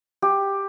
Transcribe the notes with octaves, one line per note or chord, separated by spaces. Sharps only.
G4